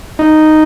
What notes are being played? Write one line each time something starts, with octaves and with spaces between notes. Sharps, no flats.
D#4